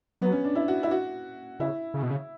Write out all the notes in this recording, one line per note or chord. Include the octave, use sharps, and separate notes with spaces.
F#3 B3
C#4
D4
E4
F#4
E4
F#4
C#3 E4
C#3
B2
C#3